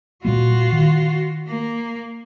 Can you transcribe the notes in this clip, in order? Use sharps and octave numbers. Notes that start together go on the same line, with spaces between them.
A#2 G3 A#3 F4 F#4
D#3
A#3